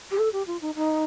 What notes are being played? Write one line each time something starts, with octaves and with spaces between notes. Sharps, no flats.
G4
A4
G4
F4
D#4
D#4